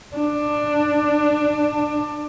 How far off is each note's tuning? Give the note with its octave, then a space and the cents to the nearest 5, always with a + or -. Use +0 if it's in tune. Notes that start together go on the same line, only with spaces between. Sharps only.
D4 +15